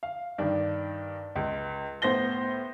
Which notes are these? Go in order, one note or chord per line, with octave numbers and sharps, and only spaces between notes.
F5
G2 D#3 D4
C#2
A2 B3 C5 C6 A#6 G7